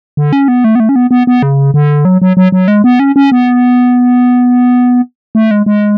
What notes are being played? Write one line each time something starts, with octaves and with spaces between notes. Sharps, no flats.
D3
C#4
B3
A3
B3
A3
C#4
B3
B3
B3
C#3
D3
F#3
F#3
F#3
F#3
G#3
B3
C#4
C#4
B3
A3
G#3
G#3